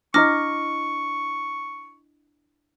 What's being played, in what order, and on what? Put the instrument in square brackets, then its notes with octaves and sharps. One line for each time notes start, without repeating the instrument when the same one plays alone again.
[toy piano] D4 E4 D#5 [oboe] C#6 [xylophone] D6 F6 A#6